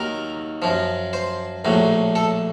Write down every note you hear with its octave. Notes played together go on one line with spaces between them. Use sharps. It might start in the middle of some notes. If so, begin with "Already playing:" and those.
Already playing: D#2 D#3 F#3 A#4
F#2 F3
C5
A#1 A2 F#3
A4